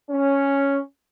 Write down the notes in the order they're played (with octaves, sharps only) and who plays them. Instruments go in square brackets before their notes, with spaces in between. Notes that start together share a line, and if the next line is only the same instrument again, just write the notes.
[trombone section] C#4